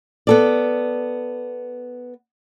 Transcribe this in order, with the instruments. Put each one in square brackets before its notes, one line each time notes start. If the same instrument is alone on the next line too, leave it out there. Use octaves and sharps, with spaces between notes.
[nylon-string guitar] B3 A4 D5